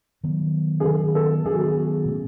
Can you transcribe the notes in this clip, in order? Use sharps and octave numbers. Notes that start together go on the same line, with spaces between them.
D#3 F#3 B3
G#4
D#3 F#3 B3 A4
A4
D#3 F#3 B3 G#4
F#4
G#4
B2 A3 C#4